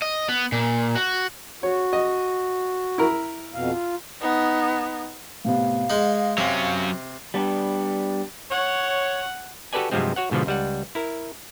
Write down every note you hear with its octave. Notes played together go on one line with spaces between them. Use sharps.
D#5
B3
A#2
F#4
F#4 C#5
D#5
E4 A#4
F2 B2 F5
F4
B3 D#4
A2 C3 B3 F5
G#3 D#4 F#7
C3 F#3 C#4
G3 B3 D4
C#5 F#5
F#4 G4 A4 B4 D5 G#5
G2 C3 F3 F#3 G#3 C4
F#4 C#5 F#5
G#2 B2 D3 F3
C#2 G3 F#5
E4 A#4